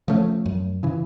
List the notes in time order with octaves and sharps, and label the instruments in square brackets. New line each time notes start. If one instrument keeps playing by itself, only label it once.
[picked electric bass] F3 A3 C#4
F#2
C#3 E3